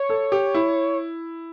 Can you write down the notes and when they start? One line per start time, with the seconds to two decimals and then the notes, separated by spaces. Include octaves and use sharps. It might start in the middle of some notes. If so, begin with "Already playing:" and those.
Already playing: C#5
0.09 A4
0.32 G4
0.54 E4